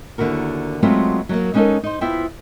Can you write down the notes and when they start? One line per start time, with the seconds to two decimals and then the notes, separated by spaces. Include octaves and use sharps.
0.18 D#2 D3 E4 F#4 A#4
0.83 F#3 G#3 A3 B3 C4 F4
1.29 F#3 A3 A#3
1.54 G3 G#3 C#4 D#4 A4 A#4
1.83 D#4 C5
2.01 B3 E4 F4 C5 G5